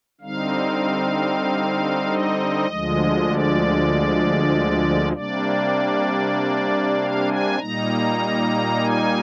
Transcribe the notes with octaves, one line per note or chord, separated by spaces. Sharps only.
D3 G3 C4 D#4 F5
D#5
D2 D3 F3 G#3
D5
C3 G3 A#3 D4 D5
F5
G#5
A#2 G3 A#3 D#4 A#5
G#5